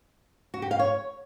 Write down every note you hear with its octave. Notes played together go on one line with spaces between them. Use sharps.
F#4
G4
F5
C#5